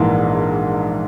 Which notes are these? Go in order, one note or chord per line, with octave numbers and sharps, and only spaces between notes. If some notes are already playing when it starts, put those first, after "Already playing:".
Already playing: A#1 G#2 E3 A#3 E4